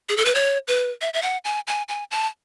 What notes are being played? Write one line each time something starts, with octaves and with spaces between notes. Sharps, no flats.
G#4
A4
B4
C#5
B4
E5
E5
F#5
G#5
G#5
G#5
A5